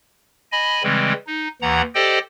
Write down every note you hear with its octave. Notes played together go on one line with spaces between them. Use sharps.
D#5 G#5 B5
C#3 E3 G3 G#3 C4
D#4
D#2 E3 F#5 A#5
G4 A4 C5 D5 D#5 G5